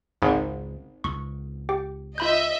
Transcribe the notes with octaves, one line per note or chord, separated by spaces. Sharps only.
G#1 C#2 G#2
C#2 C#6
G4 G5
F4 D#5 E5 B5 G6